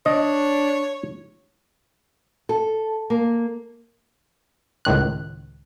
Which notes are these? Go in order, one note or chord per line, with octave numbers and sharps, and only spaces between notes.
D4 C#5 D#5
A4
A#3
C#2 A2 D#3 F#6